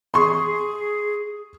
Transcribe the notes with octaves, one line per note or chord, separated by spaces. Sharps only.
G#4 C6 C#6